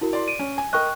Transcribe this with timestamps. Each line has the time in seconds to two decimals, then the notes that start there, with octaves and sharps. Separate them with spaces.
0.01 E4 F#4 A#4
0.13 D5 C6
0.28 D7 D#7
0.39 C#4
0.58 G#5
0.73 A#4 D#5 G5 C#6 F#6